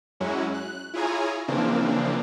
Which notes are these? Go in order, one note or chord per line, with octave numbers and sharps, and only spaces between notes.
F#2 F#3 G#3 C#4 E4 F#4
F#6
E4 F4 G#4 C#5 G#5 A#5
C#3 E3 F3 A#3 C4 D4